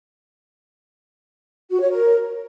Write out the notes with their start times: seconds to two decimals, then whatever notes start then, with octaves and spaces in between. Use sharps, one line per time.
1.70 F#4
1.80 C#5
1.91 A#4